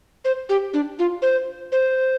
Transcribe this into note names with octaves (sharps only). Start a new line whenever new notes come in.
C5
G4
D4
F4
C5
C5